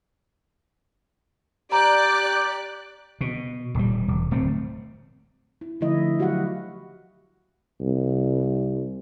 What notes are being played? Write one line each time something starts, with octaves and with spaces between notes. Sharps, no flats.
G4 D5 A#5 F#6
B2
D#1 G3
E1
D1 A3 C4
E4
D3 F3 A3 E4 D#5
F#3 F#4 G4 F5 F#5
C2